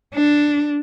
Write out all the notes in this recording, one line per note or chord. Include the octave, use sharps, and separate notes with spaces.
D4